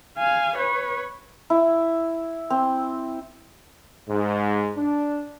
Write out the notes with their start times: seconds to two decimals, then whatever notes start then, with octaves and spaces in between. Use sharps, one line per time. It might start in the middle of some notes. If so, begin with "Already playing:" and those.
0.18 F5 G#5
0.57 B4 C#5
1.50 E4
2.50 C4
4.09 G#2
4.76 D4